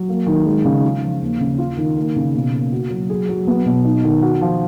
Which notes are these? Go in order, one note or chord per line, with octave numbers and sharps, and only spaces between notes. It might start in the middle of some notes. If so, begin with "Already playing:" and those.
Already playing: F#3
A#3
D#3
G#3
C#3
F4
F3
D#2
C#3
F4
D#3
A#3
C#3
B2
A#3
F#4
F#3
G#4
F#3
B3
B2
D#4
D#3
F#4
F3